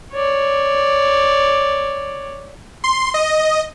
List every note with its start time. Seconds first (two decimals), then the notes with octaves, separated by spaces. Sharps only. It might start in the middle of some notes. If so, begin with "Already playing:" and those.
0.13 C#5 D5
2.84 C6
3.14 D#5